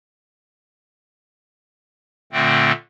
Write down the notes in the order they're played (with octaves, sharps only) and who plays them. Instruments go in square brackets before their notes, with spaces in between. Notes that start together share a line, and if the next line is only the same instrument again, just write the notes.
[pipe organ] A#2 D3 A3 C4